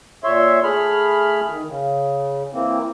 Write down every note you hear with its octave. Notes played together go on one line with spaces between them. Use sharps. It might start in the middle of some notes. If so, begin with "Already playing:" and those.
A#2 C#5 E5 C6
A3 G#4 B5 F6
D#3
C#3
E3 A#3 C4